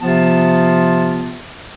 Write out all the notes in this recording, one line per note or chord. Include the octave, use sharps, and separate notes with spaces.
C3 F3 B3 F4 A5